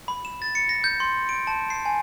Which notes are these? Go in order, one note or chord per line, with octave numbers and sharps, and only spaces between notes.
B5
E7
A6
C#7
A#6
G6
C6
D7
A5
C7
G#5